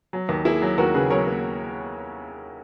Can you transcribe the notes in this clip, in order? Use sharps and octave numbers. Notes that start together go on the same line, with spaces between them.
F#3
D#2
A#3 E4 G#4
F#3
D#2 F#4 A#4
C#3 G#4 B4
F#3 A#4 C#5
A#3